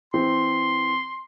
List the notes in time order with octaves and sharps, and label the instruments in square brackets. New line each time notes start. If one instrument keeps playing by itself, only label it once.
[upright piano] E3 C4 [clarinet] C6